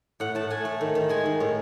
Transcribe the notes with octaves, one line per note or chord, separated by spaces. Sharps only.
A2 F#5
A2 A5
A3 G#5
A3
D#3
D#3
G#3 G#5
D#3
A2